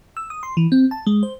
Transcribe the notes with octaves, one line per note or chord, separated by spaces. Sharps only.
E6
D#6
C6
E3
C4
A5
G#3
C5